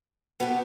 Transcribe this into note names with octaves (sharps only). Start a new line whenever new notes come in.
B2 B3 D4 G4